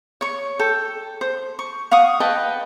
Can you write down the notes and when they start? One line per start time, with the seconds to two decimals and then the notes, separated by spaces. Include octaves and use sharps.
0.21 C#5 C#6
0.59 A4 G5
1.21 C5
1.59 C#6
1.91 F5 F#5 C#6 D#6
2.20 B4 D#5 G5 A5